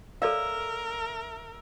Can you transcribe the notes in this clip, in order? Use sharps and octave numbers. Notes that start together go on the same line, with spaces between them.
A4 A#4 D5 E5 F5